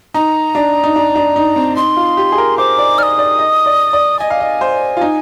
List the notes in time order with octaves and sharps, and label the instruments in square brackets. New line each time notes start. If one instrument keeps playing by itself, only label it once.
[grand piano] D#4 [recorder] A#5
[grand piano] D4
D#4
D4
D4
D#4
C4
[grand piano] D#4 [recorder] C6
[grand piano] F4
G4
G#4
A#4
[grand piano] C5 [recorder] D6
[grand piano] D5
[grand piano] D5 [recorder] D#6 F6
[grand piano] D5
D#5
D5
D5
[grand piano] D#5 [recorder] G#5
[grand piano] F5
D#5
C5
F4
D#4